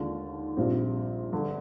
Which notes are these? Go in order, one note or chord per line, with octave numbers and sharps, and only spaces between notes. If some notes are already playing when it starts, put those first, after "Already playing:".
Already playing: D#2 D3 G#3 D4 F4
A#1 A#2 G3 C4
G1 G2 D3